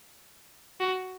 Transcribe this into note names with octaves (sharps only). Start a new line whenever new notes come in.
F#4